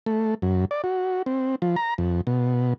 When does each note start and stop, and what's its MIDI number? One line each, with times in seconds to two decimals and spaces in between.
0.06 0.35 57
0.42 0.65 42
0.71 0.82 74
0.84 1.22 66
1.26 1.56 60
1.62 1.76 53
1.76 1.94 82
1.98 2.21 41
2.27 2.74 47